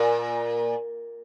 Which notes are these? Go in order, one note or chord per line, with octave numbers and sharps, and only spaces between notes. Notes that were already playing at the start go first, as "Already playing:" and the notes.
Already playing: A#2